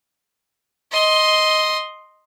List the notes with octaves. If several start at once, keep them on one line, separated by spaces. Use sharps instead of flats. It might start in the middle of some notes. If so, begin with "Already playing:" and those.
D#5 C6